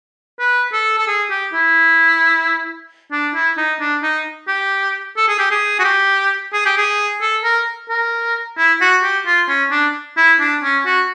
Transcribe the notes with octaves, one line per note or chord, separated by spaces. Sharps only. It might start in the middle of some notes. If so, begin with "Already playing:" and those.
B4
A4
A4
G#4
G4
E4
D4
E4
D#4
D4
D#4
G4
A4
G#4
G4
G#4
F#4
G4
G#4
G4
G#4
A4
A#4
A#4
E4
F#4
G4
F4
C#4
D4
E4
D4
C#4
F#4